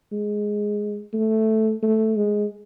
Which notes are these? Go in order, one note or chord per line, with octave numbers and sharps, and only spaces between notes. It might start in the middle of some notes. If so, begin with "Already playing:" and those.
G#3
A3
A3
G#3